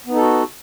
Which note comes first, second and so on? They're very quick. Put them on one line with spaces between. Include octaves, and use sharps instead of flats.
B3 D#4 A4 F#4